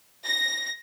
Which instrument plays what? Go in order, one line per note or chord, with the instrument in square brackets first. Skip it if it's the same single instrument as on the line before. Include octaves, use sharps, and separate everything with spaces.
[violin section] A#6